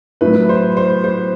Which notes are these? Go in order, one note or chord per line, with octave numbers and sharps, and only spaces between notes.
A2 F#3 B4
C5
C5
C5